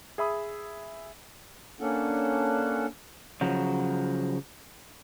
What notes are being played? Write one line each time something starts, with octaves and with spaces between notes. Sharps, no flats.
G#4 E5 B5 D#6
A#3 C#4 D4 A4 F#5
C#3 F3 F#3